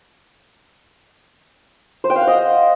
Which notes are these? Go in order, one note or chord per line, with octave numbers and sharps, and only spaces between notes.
C5
G5
F5
F#5
D#5